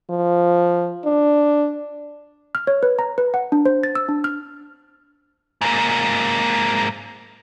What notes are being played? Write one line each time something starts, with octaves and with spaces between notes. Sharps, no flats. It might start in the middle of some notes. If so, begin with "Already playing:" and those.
F3
D4
F6
C#5
B4
A#5
B4
F#5
D4
C5
A6
E6
D4
F6
G#2 A#3